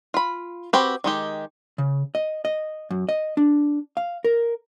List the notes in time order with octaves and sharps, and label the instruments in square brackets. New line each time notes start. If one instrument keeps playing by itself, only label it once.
[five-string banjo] F4 B5
C4 F#4 G4 B4
D#3 G#3 G4
[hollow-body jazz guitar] C#3
D#5
D#5
F#2
D#5
D4
F5
A#4